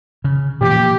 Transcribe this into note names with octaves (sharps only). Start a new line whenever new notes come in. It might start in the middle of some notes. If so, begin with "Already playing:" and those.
C#3
A#2 E3 F3 G4